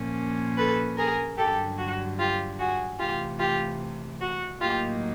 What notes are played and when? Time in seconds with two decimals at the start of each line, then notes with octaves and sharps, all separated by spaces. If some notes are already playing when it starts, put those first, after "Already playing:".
Already playing: A#2 F3 A#3 C#4
0.57 A4 B4
0.97 G#4 A#4
1.38 G2 D3 F#3 G4 A4
1.78 F#4
2.18 F4 G4
2.58 F#4 G#4
2.99 C3 E3 A3 F4 G4
3.39 F4 G4
4.20 F#4
4.60 A2 F#3 A#3 D#4 F4 G4